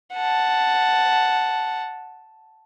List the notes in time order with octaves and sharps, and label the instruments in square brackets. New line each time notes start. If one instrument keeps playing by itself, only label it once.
[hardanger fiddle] F#5 A5